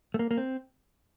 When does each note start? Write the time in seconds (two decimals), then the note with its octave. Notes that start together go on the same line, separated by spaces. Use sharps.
0.14 A3
0.19 A#3
0.31 A#3
0.37 C4